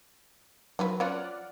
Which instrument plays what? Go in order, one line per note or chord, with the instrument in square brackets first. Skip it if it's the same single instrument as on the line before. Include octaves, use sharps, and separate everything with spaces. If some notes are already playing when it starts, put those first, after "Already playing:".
[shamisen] D#3 F3 B4 [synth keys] F#3
[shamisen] F3 C#4 F4 [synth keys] D5 F#5 F6